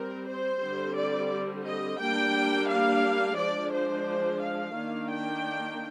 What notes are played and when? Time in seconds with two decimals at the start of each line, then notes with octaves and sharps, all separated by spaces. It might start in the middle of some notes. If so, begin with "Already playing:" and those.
Already playing: G3 C4 A#4
0.27 C5
0.61 D3 G3 C4
0.96 D5
1.65 D#5
2.00 G3 A#3 D4 G5
2.68 F5
3.37 F3 G#3 D4 D5
3.72 C5
4.42 F5
4.76 D#3 A#3 D4
5.11 G5